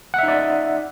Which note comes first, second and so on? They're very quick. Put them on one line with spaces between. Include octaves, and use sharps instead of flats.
F#5 E5 D#4 D5